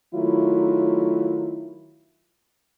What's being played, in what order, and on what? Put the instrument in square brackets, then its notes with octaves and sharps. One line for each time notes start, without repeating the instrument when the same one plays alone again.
[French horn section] D#3 F#3 A3 E4 F4